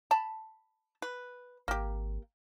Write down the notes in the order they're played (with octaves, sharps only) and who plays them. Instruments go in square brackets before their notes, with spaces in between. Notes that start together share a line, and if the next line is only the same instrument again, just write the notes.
[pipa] A5 B5
B4
[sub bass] G#1 [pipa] A#3 G4